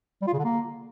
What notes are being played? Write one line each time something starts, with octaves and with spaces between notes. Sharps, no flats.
G3
F4
C#3
D3
A#3